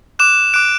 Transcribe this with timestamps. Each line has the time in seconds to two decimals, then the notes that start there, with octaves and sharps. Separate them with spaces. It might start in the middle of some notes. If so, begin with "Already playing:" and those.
0.19 D6 F#6 E7
0.54 D6 F#6 D7